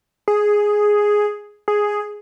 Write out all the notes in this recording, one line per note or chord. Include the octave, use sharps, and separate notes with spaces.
G#4
G#4